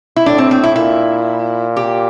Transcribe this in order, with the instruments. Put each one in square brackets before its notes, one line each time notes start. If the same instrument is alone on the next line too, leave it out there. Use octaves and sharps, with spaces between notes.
[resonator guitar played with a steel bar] E4
[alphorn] A2 [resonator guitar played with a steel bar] D4
[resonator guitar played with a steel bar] C4
C4
E4
[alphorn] A#2 [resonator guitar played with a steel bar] E4
[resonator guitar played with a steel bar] G4